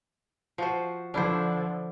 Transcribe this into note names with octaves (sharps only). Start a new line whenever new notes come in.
F3 F#4 C5
D3 F3 D4 E4 C5